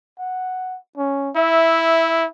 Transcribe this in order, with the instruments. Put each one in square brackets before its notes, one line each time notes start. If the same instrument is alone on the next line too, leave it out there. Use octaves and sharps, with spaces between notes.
[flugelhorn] F#5
C#4
[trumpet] E4 [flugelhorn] E5